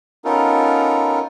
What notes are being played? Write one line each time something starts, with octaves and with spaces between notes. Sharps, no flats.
B3 C#4 D#4 F4 A4 A#4